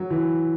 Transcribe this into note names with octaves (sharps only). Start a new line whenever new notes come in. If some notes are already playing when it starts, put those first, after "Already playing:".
Already playing: F#3
E3